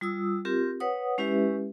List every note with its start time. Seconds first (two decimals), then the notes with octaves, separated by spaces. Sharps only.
0.01 G3 F4 D#6 E6
0.45 C4 F4 G4 A#4
0.80 B4 C#5 F#5 D#6
1.18 G#3 C#4 E4 G4 B4 E5